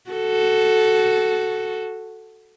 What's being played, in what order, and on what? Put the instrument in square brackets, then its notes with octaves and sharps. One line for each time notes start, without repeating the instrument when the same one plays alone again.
[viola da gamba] F#4 A4